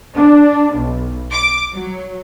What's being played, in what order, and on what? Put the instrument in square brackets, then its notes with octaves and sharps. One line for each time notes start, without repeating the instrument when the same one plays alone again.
[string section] D4
B1
D6
F#3